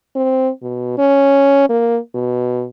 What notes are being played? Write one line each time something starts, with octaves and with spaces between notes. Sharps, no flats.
C4
B2
C#4
A#3
B2